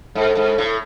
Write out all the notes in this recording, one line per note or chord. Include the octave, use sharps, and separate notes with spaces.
G#2 A4
G#2
A2